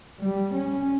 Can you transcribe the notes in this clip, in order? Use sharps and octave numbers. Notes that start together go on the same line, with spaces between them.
G3
C#4